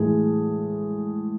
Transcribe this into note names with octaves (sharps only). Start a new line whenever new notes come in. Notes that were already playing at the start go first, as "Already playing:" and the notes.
Already playing: A2 E3 G#3 G#4